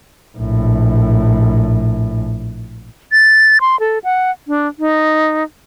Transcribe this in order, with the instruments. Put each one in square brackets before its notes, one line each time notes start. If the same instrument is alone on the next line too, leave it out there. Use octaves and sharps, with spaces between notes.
[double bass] A#1 A2
[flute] A6
C6
A4
F#5
D4
D#4